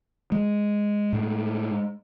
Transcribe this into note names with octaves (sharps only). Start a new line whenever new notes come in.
G#3
A2